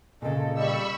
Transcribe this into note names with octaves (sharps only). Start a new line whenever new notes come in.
A#2 C#3 A4 D#5
G3 B5 C#6 E6